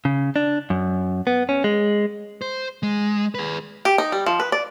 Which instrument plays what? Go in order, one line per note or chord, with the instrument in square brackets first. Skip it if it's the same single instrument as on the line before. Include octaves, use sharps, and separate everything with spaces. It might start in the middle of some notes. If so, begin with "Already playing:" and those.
[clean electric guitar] C#3
D4
F#2
B3
C#4
G#3
[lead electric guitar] C5
G#3
G#4 B4
[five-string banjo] G4
D#4
G3
F3
B4
D5